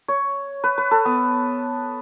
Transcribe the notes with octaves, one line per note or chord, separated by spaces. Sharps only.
C#5
B4
B4
A4
B3